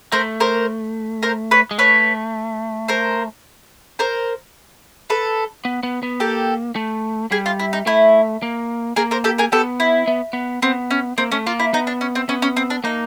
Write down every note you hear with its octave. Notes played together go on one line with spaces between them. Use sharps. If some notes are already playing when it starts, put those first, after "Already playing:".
A3 A#4 C5
A#4 C5
A#4 C5
B4 C#5
G#3
A3 B4 C#5
A#4 C5
A#4 C5
A4 B4
B3
B3
B3
A#3 G4 A4
A3
G3 G#4
F4
E4
D#4
A3 E4
A#3
A#3 G#4 A#4
A#4 C5
G4 A4
G#4 A#4
B3 G4 A4
E4
B3
B3
B3 C4
C#4
A#3 C4
A3 C#4
A#3 F4
E4
B3 D#4
D4
C#4
C4
B3 C#4
C#4
C4
D4
A#3 D#4